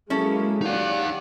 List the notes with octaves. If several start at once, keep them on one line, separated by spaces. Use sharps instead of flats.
F#3 G#3 A#3 C#4 E4 A4
D#4 G4 D5 F5 F#5